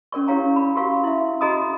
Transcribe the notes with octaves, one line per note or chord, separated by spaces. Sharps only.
C#4 A#4 D5 C#6
E4 G4 C#5 F5 A#5
B5
F#4 G4 A#4 F5 C#6
E4 E5
F#4 G#4 D#5 A#5 B5 D#6